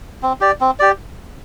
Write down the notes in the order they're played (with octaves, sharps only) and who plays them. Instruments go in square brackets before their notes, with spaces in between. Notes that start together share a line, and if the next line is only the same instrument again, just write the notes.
[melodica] C4
G4 D5
C4
G4 D5